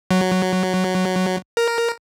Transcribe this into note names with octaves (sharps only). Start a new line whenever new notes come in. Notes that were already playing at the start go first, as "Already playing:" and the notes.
F#3
A#4